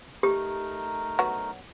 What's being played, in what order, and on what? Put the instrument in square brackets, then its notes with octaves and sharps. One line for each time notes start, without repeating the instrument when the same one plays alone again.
[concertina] A3 D#4 A#4 [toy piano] G4
[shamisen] F#3 B3 F#4